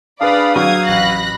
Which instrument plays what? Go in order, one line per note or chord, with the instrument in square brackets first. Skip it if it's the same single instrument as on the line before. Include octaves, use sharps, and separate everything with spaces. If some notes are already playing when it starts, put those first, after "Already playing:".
[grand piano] D4 G#4 B4 [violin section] D5 B5 [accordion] F5 D#6
[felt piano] F#3 [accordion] F5 [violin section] D#6 G#6
[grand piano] A1 [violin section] B5 F#6 A#6